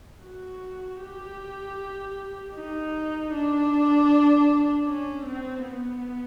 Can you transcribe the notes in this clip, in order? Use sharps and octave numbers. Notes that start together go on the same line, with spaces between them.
F#4
G4
D#4
D4
C#4
C4
B3